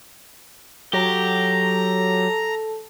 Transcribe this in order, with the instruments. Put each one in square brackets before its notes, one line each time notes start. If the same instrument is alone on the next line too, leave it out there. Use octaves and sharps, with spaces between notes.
[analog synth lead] F#3 [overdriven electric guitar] G4 [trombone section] A4 [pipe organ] A#5